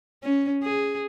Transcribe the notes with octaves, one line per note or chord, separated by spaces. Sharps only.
C#4
G#4